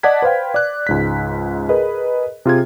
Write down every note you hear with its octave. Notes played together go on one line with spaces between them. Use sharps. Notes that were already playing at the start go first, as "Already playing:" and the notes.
D5 D#5 F#5 A5 G#6 B6
B4 C5 F5 G5
D5 F#6
C#2 G#2 B6
G#4 A#4 B4 D#5
C3 F4 G#4 G#6